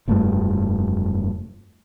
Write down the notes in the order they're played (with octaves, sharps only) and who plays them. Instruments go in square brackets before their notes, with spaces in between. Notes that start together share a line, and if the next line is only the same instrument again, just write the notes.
[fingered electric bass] F1 G2 A3